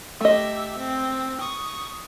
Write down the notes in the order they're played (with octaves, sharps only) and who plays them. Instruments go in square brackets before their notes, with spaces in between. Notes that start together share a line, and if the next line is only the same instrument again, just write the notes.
[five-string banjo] A3 D#5 [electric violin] G4 E5
[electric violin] C4
C#6 D#6